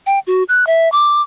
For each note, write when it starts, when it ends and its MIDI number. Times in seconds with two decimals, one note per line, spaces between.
0.06 0.19 79
0.27 0.43 66
0.49 0.67 90
0.67 0.91 76
0.92 1.21 86